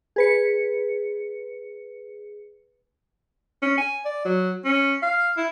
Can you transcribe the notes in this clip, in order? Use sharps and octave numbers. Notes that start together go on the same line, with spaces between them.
G#4 B4 C#7
C#4
G#5
D5
F#3
C#4
F5
E4